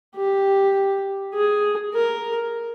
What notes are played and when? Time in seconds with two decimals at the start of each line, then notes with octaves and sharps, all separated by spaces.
0.16 G4
1.35 G#4
1.94 A#4